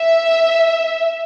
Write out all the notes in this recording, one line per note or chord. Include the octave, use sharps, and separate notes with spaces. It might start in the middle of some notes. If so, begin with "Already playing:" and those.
Already playing: E5